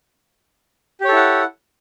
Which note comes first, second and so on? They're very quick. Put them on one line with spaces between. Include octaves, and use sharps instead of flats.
G4 C#5 A4 E4 F#5